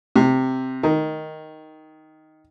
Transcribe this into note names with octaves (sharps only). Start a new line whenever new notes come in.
C3
D#3